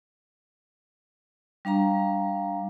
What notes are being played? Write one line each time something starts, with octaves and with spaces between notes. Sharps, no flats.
G3 D4 F5 A#5